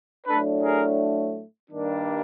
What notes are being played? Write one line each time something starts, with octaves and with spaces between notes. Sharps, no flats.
A2 F#3 A3 D4 A4 B4
G#4 A#4
G2 D#3 G3 A#3 D4